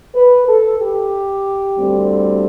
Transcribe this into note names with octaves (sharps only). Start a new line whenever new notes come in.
B4
A4
G4
D2 D3 G3 C4